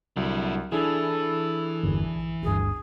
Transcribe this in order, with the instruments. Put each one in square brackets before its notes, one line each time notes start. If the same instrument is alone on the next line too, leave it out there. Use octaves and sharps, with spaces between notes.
[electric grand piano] C2 F#3 [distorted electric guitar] D3 E4
[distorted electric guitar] E3 [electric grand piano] D4 E4 G#4 [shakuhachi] A4
[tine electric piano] G1 E2
A#1
[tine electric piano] G1 D2 G2 [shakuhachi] G#4